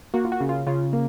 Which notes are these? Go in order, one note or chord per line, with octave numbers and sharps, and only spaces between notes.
A#3 F#4
F4
F#4
C#3
F4
C#3 F4
A#3